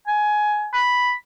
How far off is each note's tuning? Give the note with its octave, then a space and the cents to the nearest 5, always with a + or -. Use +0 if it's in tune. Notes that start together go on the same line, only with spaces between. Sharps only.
G#5 +15
B5 +0